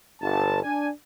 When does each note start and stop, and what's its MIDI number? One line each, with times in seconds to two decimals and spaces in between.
0.20 0.60 31
0.20 0.60 81
0.63 0.89 62
0.63 0.89 80